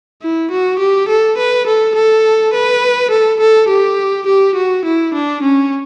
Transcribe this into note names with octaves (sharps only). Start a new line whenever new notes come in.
E4
F#4
G4
A4
B4
A4
A4
B4
A4
A4
G4
G4
F#4
E4
D4
C#4